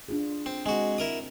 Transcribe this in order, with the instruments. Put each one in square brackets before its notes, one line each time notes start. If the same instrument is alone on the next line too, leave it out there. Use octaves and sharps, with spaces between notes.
[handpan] D4 F4 G#4
[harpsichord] C4
[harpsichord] G#3 F#4 [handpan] C4
[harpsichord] E4 A#4 D#6